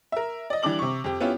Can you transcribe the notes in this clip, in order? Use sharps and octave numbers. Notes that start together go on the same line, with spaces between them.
A#4 E5
D5 D#5
E3 G3 D4 D6 F#7
C3 C#6
F2 G4
B3 C#4 E4 F4 G4